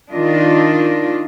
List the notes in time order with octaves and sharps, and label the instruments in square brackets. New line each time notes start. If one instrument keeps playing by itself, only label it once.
[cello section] D#3 D4 F4 D#5